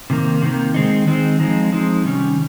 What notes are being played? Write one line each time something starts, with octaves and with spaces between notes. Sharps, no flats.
C3 D#3 A#3
C3 D#3 A#3
D#3 G#3 C4 D#4
D#3 G#3 C4 D#4
F3 G#3 C4 D#4
F3 G#3 C4 D#4
C3 D#3 G3 C#4